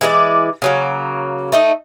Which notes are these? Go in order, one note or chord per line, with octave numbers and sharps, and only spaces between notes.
E3 G#3 A#4 D5
C#3 F#3 A#3
A3 D#4 D#5